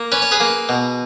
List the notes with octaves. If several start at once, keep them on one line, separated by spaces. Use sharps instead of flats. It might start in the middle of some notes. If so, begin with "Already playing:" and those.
Already playing: A#3
C#4 B4
C#5
G#4 B4
A#3
B2